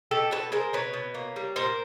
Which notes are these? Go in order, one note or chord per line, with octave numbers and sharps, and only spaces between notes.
B2 G4 A4
B2 A4 B4
G#3 A#4 C5
B2 B4 C#5
B2
A#3
G3
A#2 A#4 C5